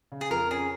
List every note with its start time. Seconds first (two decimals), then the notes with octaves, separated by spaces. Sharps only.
0.12 C#3
0.21 G#4
0.30 F2 A#4
0.51 C#4 G#4